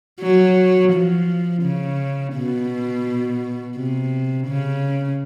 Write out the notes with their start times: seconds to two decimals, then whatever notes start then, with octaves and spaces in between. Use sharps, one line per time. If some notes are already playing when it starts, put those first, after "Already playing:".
0.21 F#3
0.93 F3
1.63 C#3
2.35 B2
3.77 C3
4.48 C#3